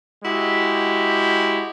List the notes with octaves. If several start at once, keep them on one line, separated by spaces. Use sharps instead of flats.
G#3 E4 F#4 G4